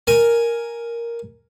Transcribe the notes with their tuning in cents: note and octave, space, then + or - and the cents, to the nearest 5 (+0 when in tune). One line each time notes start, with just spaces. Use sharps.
A#4 +0 G#5 +0